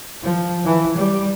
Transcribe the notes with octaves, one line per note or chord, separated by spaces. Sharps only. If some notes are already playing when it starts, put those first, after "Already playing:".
F3
E3
G3